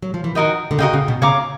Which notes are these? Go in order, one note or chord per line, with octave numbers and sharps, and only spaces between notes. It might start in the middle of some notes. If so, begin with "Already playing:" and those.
F#3
F3
E3
D#3 F#4 A#4 D#5 G5
D3
C#3 F#4 A#4 D#5 G5
C#3
B2
C#3 C#5 F5 A#5 D6